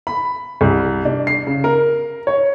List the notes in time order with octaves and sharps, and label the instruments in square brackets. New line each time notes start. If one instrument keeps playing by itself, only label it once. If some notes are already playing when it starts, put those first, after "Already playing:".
[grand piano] B5
C2
D4
C7
C#3
A#4
C#5